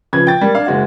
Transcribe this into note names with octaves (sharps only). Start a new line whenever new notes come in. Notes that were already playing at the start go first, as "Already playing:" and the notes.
C#3 F3 B4 G#6
G5 A6
G3 A#3
D4 F5
F#1 G#3 F#4